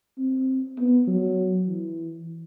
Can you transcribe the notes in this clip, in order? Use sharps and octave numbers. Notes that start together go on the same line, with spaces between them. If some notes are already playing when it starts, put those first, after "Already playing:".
C4
B3
F#3
E3